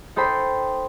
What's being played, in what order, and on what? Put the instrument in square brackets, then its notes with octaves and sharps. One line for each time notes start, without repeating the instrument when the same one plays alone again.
[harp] D#4 A4 C5 G5 B5 C6